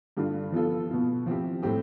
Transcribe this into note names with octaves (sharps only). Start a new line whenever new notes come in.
G2 D3 G3 D4 F4
F3 B3 F4 A4
B2 B3 F4
F3 C4 E4 G4
A2 G3 C4 G4